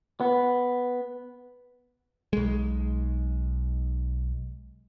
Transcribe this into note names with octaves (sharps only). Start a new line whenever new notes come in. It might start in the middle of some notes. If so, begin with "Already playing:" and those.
B3
B1 G#3